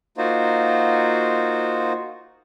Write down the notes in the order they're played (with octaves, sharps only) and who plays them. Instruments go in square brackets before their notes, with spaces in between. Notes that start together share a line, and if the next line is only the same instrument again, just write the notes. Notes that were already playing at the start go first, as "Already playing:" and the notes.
[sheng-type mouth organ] A#3 D#4 F4 F#4 C5